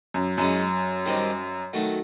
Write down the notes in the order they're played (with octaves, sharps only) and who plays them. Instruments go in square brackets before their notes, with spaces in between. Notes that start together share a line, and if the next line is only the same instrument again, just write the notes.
[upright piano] F#2
[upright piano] F#2 [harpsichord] G#3 C#4 E4
[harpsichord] D#3 G3 C4 D#4 G4
D#3 F#3 A3